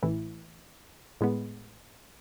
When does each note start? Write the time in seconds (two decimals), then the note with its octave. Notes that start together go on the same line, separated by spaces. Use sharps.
0.03 A1 A2 E3
1.21 A2 G#3 B3